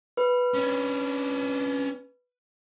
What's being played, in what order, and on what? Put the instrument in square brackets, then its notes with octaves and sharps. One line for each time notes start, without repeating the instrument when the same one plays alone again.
[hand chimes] B4
[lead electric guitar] C#4 D4